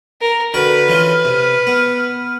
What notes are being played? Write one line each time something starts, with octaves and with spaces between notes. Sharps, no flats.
A#4
D3 F#4 B4 G5 F6
E3 C#4 F4
C3
B3